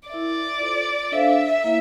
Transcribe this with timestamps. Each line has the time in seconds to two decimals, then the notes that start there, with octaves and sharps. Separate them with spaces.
0.09 E4 A#4 D5 E5
0.60 F4 A4 C5
1.12 D4 A4 C5 E5 F5
1.64 A#3 E4